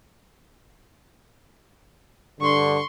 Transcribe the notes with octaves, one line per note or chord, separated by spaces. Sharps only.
G2 D3 C6 C#6